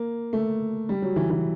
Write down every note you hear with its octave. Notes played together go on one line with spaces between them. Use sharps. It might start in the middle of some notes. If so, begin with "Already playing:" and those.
Already playing: A#3
A3
G3
F#3
E3
E3